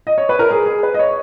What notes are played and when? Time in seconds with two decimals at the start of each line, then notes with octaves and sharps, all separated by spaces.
0.07 D#5
0.18 C#5
0.29 B4
0.39 A#4
0.51 G#4
0.66 G#4
0.83 B4
0.94 D#5
0.99 C#5